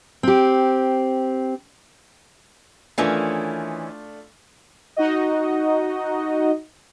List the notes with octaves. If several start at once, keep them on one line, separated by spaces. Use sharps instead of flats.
C4 G4
D#3 E3 A3 C#4 D4 F4
D#4 F#4 D#5